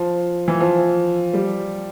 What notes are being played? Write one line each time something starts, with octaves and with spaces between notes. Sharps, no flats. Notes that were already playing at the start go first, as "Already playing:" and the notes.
Already playing: F3
E3
F3
G3